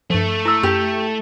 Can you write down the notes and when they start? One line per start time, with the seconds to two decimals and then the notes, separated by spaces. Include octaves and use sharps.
0.10 G2 F3 A3
0.45 E4 E6
0.63 F#2 G4